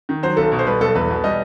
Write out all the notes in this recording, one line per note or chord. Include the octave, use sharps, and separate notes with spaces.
D#3
F#3 C5
B1 A4
B2
C5
G3 B4
B1 A4
E2 B4
B2
G3 D#5